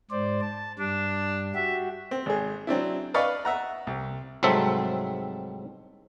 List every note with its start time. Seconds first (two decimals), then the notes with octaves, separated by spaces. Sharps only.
0.11 G#2 C5 D5
0.41 A5
0.79 G2 G3 D4
1.55 F#4 G4 E5
2.11 C4
2.26 G#1 G#4
2.67 F#3 C4 D4 E4
3.14 B4 D5 D#5 F5 B5 C#6
3.45 E5 F#5 A#5
3.87 C2
4.43 C2 G#2 F#3 C4 A4 E5